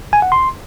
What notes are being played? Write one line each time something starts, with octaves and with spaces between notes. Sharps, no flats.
G#5
F#5
C6